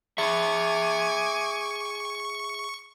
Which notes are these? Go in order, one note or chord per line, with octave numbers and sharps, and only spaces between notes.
G#4 E5 G#5 C#6 D6